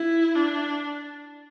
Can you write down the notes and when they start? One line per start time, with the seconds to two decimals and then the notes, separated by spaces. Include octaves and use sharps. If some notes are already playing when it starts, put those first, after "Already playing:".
Already playing: E4
0.35 D4